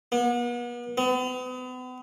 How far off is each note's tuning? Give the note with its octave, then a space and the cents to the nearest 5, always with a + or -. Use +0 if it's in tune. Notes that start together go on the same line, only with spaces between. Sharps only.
B3 -40
B3 +40